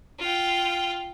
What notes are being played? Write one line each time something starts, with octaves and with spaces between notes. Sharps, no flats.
F4 G5